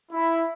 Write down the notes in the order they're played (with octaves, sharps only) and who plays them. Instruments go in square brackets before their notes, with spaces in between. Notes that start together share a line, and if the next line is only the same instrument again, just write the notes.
[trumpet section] E4